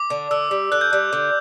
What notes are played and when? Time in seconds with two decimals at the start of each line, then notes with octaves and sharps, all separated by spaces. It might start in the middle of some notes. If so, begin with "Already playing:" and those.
Already playing: D6
0.10 D3
0.31 D3 E6
0.51 G3
0.72 D3 F#6
0.81 G6
0.91 G3 F#6
1.13 D3